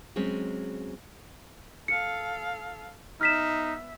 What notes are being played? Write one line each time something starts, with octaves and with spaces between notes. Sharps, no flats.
F#3 G#3 C4 C#4
A4 F5 C#7
B3 D#4 E5 F6 B6 E7